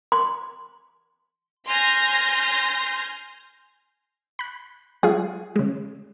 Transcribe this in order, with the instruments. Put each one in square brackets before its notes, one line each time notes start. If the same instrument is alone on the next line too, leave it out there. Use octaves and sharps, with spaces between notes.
[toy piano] C6
[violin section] G#5 C6 F6 G6 A#6
[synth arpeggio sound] B5 F#6
[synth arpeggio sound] F#3 G#3 F4 [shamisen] G#4
[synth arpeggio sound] C#3 G#3